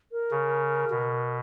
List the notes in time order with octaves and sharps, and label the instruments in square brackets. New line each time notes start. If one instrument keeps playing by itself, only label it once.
[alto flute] A#4
[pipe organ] C#3
B2